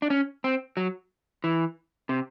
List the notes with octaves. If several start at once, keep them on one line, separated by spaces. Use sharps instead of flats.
D4
C#4
C4
F#3
E3
C3